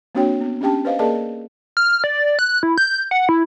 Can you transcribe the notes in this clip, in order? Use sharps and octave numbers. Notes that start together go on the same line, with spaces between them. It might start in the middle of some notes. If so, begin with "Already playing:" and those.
A#3 C4 D4 F#4 C#5 G5
B3
C#4 D4 G4 G5 A5
B4 C5 D#5 F5
A#3 G#4 A#4 D5 D#5 A5
F6
D5
F#6
E4
G6
F#5
E4